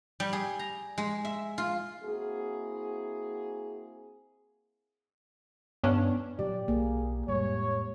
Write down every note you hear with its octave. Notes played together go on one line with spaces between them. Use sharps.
G3
G#4
A#5
G#3
E5
F4
A#3 C4 E4 F#4 G#4
G2 B3 C#4 D4
A#2 F#3 G4 D5
B1 A#3 G#4
F2 A2 G3 G#3 C#5